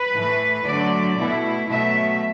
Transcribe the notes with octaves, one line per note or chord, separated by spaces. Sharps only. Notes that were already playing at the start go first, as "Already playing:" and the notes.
Already playing: B4
A2 E3 A3
D3 F#3 A3 D5
B2 A3 E4
B2 F#3 A3 E5